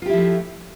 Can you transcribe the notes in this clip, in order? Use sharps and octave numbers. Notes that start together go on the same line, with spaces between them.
F3 A3 E4 F4 G4